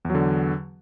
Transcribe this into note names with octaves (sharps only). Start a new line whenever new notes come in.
E2 D3 F#3